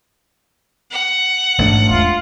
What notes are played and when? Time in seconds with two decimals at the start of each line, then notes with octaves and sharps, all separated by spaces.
0.91 F#5
1.58 A1 G#2 A3 D4
1.90 E2 G#3 F4